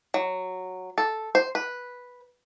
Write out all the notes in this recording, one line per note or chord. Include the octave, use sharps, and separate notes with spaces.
F#3
A4
C5
B4